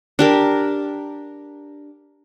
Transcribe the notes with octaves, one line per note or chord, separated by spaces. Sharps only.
D4 G4 A#4